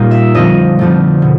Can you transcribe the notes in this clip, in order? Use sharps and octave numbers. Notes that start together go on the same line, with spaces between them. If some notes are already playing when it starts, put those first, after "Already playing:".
Already playing: A#2 G3 A#3 D#4
E5
F2 D3 F3 A3 D#5
F2 D3 F3 A3
B2